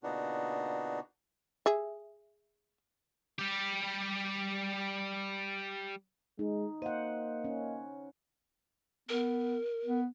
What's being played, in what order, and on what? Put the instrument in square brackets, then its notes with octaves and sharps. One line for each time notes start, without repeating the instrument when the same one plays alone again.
[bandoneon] A#2 C#3 B3 D4 D#4 F#4
[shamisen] G#4 E5
[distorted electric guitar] G3 G4
[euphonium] G#3 [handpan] D#4
[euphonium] A#3 [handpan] C5 F#5 [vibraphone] D#5 F5
[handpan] C#4
[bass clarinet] B3 [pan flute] A#4
[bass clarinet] B3